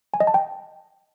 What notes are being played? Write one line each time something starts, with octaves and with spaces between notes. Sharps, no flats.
G#5
D#5
A5
G5